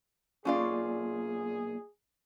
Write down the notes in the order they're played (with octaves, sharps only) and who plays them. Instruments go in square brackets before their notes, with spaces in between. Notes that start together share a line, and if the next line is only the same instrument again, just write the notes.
[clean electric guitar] B1 A#2 [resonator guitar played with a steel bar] C#4 F4 D5 [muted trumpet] G#4